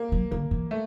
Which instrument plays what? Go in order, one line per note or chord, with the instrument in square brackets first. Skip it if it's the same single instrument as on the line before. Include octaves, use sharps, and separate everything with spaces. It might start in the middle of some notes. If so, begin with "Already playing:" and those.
Already playing: [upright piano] A#3
[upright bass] F#3
[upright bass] D3 [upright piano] A#3
[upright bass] E3
[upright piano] A3